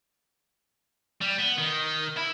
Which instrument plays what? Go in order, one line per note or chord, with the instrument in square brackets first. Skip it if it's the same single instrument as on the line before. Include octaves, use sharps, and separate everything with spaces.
[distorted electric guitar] G3
B3
D#3
E4